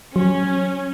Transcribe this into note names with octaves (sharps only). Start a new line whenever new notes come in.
F#3 C#4